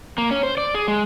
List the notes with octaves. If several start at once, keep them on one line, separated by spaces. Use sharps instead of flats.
A#3
C#4
C5
D5
G#4
G#3